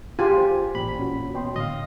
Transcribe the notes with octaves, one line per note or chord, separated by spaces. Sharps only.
F4 G4 G#4 G#5
C5 G5
A1 A#2 B5
C#4 F#4
B2 C#5 G5 C6
A2 D3 D#5 F5